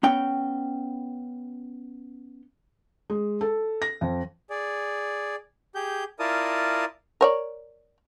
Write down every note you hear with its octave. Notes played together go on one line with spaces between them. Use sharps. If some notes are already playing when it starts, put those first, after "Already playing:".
B3 C#4 G5
G#3
A4
A#6
F2
G#4 D5
G4 G#4 G6
E4 F4 A#4 D5 A5 D#6
A#4 C#5 D5